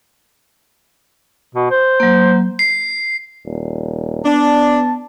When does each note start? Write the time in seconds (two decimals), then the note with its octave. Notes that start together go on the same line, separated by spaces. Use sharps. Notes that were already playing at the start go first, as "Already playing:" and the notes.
1.54 B2
1.71 C5
2.00 F#3 A#3
2.59 C7
3.45 D#1
4.25 B3 D4 A5